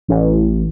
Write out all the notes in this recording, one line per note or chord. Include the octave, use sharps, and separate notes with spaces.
A1